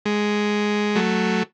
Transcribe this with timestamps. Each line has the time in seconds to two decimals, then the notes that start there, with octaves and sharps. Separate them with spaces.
0.06 G#3
0.95 F#3 A3